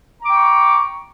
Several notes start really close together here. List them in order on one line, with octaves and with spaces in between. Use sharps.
A#5 D6 G5 C#6